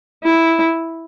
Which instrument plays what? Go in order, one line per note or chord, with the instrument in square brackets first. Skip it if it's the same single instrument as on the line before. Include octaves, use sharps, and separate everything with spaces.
[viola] E4